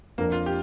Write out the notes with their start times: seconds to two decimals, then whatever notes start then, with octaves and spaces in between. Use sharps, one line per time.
0.18 F2 F3 A#3 D4 A#4
0.32 F4
0.46 G4